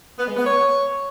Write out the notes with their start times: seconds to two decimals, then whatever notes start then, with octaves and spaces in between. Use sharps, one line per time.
0.19 B3
0.28 G#3
0.37 B3
0.46 C#5